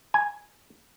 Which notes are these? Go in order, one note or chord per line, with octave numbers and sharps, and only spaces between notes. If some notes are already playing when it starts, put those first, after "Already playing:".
G#5